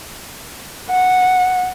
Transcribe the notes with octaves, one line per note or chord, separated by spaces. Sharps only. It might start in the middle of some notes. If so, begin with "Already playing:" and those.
F#5